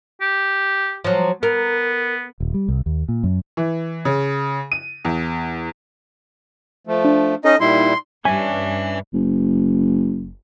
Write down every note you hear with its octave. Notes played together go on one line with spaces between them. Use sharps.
G4
F3 F#3
B3 A#4
D#1
G3
C2
D#2
A#2
F#2
E3
C#3
D#7
E2
F3 A3
D4
C#4 D#4 A4 D#5
A#2 G3 D#4 E4 C6
G2 C#4 D4 B4 E5 G#5
F#1